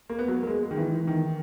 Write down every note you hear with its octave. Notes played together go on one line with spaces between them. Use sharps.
A#3
B3
F#3
A#3
G#3
G#3
D#3
E3
D#3